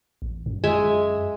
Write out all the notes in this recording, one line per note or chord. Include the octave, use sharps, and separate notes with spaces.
A1
F#2
G#3 E5 G#5